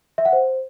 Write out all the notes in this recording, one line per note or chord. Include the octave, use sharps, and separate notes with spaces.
E5
F#5
C5